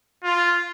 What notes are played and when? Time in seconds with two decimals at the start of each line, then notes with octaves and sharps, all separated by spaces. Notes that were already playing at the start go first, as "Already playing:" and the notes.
0.24 F4